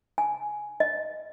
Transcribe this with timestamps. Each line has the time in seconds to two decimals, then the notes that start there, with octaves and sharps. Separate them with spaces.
0.18 G#5
0.80 D#5